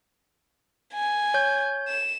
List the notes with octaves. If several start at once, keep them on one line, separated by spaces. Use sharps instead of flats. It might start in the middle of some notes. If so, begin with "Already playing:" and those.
G#5
C#5 G6
E7